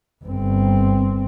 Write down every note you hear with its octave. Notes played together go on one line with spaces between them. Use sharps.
G1 C4